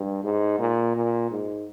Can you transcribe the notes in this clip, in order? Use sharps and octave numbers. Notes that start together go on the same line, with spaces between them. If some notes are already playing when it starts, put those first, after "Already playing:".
Already playing: G2
G#2
A#2
A#2
G#2